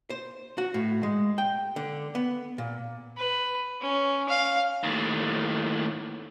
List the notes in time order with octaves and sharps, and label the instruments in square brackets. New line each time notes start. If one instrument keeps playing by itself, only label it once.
[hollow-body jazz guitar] C5
F#4
A2
G#3
G5
D3
B3
A#2
[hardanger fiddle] B4
C#4
F5
[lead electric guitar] D#2 A2